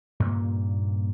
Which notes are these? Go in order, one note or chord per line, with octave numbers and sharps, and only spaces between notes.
G2 A#2 C#3 A#3